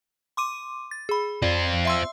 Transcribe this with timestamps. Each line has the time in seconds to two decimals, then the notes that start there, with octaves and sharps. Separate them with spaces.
0.37 C6 D6 D#7
0.91 A6
1.09 G#4 B5
1.42 C4 F4 D5
1.85 E5 C6 E6